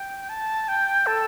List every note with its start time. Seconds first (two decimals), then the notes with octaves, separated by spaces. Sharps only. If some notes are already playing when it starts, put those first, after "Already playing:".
Already playing: G5
0.29 A5
0.68 G5
1.06 A4